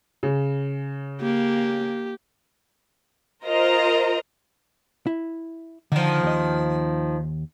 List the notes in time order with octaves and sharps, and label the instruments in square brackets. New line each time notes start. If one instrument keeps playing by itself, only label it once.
[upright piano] C#3
[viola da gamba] A#3 [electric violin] G4
[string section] F4 A#4 C5 D#5 A#5
[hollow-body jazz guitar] E4
[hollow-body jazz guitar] D3 [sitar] D#3 F3
[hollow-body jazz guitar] D#2 D#5